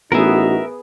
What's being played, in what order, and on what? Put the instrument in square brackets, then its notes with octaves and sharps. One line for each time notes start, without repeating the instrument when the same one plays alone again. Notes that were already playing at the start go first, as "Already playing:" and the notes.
[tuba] A1 [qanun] B3 G#4 [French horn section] D#4 F#4 [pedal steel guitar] A#4 E5